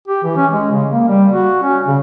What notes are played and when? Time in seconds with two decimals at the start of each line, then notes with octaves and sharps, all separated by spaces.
0.08 G4
0.24 E3
0.37 C#4
0.51 G#3
0.72 C#3
0.90 A#3
1.08 G3
1.32 F#4
1.63 C#4
1.87 C#3